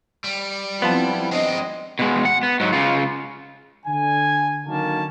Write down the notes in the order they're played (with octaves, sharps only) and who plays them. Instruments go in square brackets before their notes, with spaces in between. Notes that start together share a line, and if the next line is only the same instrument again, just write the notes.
[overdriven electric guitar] G3
[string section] F3 C4 E4 [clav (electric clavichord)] B3 F4 A5
[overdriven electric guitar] G#3 C4 [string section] D4 D#5
[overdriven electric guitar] B2 G#3
F#5
B3
G#2 F#3
C#3 F4
[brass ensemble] D3 G#5
D3 D#3 F#3 A#3 C#4 A5